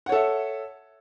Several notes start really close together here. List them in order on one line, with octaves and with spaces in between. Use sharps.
F#5 C#5 A4 E5